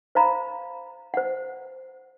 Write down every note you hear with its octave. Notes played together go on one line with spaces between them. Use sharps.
C5 F5 A#5 B5
C5 F#5